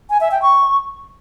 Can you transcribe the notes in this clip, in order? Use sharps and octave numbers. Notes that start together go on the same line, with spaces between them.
G#5
E5
G5
C#6